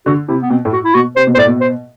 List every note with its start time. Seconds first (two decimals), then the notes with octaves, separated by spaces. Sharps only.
0.06 D3 F#4
0.29 C3 E4
0.42 B3
0.50 B2 C4
0.65 A2
0.73 F#4
0.84 E4
0.95 B2 F#4
1.16 C3 C5
1.27 B2
1.35 A2 C5 D5
1.47 B2
1.61 C5